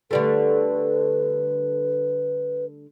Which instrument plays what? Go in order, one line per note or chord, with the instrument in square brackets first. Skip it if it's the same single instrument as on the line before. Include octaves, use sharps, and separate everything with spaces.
[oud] D3 G3 A3 [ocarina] B4